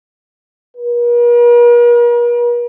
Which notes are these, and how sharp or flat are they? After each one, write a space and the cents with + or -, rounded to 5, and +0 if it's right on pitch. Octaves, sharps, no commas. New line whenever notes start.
A#4 +45